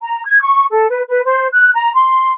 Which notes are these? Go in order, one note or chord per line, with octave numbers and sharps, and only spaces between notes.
A#5
G#6
C#6
A4
B4
B4
C5
F#6
A#5
C6